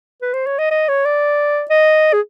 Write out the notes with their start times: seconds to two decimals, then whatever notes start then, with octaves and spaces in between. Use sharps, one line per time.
0.22 B4
0.34 C5
0.47 C#5
0.59 D#5
0.71 D#5
0.89 C#5
1.05 D5
1.70 D#5
2.13 G#4